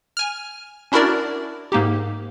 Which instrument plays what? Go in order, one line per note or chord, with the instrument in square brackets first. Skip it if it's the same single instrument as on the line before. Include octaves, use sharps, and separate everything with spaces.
[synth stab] G#5 F6
C#4 D4 E4 F#4 A#4 D5
G#2 A#3 D#4 G4